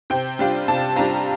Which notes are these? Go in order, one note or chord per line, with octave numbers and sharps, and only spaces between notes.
C3 G5
G3 D4 F4
C3 A5
G3 D4 F4 A#5